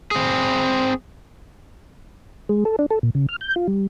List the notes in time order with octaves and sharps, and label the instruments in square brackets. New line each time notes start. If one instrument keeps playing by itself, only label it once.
[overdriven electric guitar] C4 G#4
[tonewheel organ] G#3
A4
D4
A4
A#2
C#3
F6
G6
F4
G3